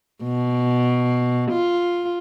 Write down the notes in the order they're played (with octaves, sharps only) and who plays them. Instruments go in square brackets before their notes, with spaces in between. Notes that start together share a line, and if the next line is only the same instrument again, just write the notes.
[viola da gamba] B2
F4